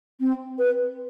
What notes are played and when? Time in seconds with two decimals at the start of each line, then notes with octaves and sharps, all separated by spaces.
0.20 C4
0.59 B4